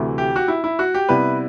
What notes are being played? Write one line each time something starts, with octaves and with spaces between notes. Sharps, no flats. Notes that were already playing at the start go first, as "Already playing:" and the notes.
Already playing: D2 C3 E3 A3 E4
G4
F#4
E4
E4
F#4
G4
C3 G3 B3 E4 B4